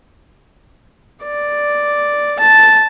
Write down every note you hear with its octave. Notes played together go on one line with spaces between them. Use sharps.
D5
A5